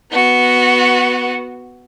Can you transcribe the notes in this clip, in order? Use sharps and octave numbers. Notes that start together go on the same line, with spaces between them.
B3 F#4